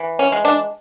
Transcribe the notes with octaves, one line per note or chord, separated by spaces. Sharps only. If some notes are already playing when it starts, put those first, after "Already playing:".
Already playing: E3
C#4
G#3
D4